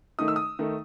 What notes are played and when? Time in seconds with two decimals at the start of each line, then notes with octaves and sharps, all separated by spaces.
0.19 D#3 A3 D#4 D#6
0.28 E6
0.36 D#6
0.59 D#3 A3 D#4